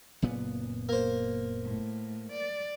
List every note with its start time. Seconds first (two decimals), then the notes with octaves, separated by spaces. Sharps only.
0.22 F#1 A#2 B3
0.89 A#3 C5
1.63 A2
2.32 D5